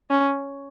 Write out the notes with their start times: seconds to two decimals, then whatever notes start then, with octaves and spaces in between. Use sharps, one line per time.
0.10 C#4